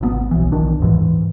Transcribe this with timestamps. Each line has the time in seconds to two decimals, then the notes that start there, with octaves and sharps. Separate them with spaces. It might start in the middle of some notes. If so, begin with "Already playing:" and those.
0.01 G#1 C3 B3
0.31 B1 E3
0.52 D#3 D4
0.80 D#2 G#2 E3